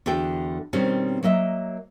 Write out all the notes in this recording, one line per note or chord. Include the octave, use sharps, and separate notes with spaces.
E2 D3 F#4 A4 G5
B2 D#3 G3 C4 C#4
F#3 A#3 D#5 E5